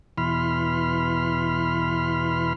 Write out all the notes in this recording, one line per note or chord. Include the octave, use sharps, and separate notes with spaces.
E2 B2 E3 B5 C6 F6